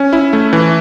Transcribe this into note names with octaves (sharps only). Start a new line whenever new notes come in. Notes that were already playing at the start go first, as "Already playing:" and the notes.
Already playing: C#4
E4
A3
E3